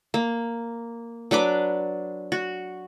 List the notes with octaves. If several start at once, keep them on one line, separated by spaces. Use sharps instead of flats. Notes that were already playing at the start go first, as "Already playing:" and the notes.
A#3
F#3 D4 B4 D6
F#4